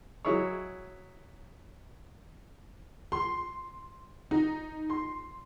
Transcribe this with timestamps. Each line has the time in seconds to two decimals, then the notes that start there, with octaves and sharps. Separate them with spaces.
0.25 F#3 G#3 E4 G#4 C#5
3.12 C6
4.31 D#4
4.90 C6